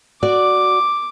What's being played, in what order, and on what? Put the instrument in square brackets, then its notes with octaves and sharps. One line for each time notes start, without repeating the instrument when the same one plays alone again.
[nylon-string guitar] F#4 D5 [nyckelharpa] D6